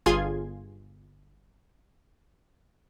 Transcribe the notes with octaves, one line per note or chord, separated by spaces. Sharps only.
G1 F4 G#4 G#5 C6 G#6